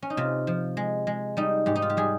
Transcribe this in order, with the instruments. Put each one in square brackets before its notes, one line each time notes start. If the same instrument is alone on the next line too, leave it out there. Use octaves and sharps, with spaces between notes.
[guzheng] C#4
D#4
C3 F4
F3
G#3
G#3
G3 D#4
G#2 G4
D#4
F4
G4
G3 G#4